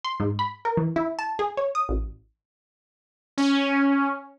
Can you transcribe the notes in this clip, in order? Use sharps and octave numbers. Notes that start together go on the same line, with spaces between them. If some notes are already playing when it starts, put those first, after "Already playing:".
C6
G#2
B5
A#4
E3
E4
A5
G#4
C#5
D#6
A1
C#4